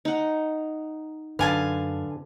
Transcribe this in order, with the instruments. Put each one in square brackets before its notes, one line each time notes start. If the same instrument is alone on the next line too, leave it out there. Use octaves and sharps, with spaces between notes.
[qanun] D#4 F#5
[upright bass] F#2 [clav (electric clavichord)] D3 B4 [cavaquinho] F5 G#5 A5